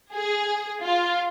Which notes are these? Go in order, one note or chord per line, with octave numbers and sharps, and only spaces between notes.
G#4
F4